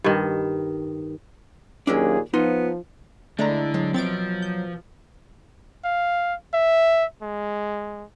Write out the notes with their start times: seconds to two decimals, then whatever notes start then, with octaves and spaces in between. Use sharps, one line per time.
0.04 G2 D#3
1.87 D#2 A#2 F#3 C#4 D4 G#4
2.34 F3 B3 D#4 F4 C6
3.39 D3 G#3 A3 D4 E4 A#5
3.74 F#3 G#3
3.94 B2 F3 C4 E5 A6 D7
4.42 G6
5.85 F5
6.54 E5
7.22 G#3